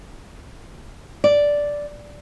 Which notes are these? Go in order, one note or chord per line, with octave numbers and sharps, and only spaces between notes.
D5